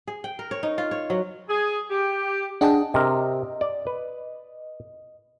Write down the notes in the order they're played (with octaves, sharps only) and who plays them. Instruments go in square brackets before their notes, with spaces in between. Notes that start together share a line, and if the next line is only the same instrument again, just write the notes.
[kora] G#4
G5
A#4
C#5
D#4
F4
C#5
F#3
[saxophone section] G#4
G4
[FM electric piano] D4 G#4 D#5 [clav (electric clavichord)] F#5 G5 A5
[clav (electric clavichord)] C3 A#4 [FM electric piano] D#5
[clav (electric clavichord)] D5
B4